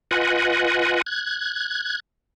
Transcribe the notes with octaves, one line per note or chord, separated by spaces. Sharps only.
F4 B4 D#5 F#5 G#5
F#6 G#6